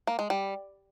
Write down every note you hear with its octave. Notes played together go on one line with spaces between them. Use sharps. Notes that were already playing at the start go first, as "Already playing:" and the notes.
A#3
G#3
G3